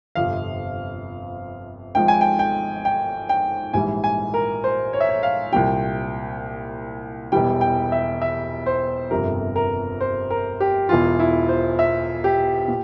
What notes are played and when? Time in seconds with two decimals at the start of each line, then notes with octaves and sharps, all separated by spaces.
0.15 G1 F2 C3 F3 F5
1.95 G#1 G#2 F3 G5
2.08 G#5
2.21 G5
2.39 G5
2.85 G5
3.29 G5
3.73 A#1 G#2 E3 G3 G#5
4.04 G#5
4.34 A#4
4.64 C5
4.93 C#5
5.00 E5
5.09 C#5
5.23 F5
5.52 C2 A#2 G3 G5
7.32 E1 E2 E3 G3 G5
7.61 G5
7.92 E5
8.22 E5
8.66 C5
9.11 G1 F2 C3 G3 A#4
9.56 A#4
10.01 C5
10.30 A#4
10.60 G4
10.89 E1 E2 E3 F4
11.19 E4
11.49 C5
11.79 E5
12.24 G4
12.68 A#2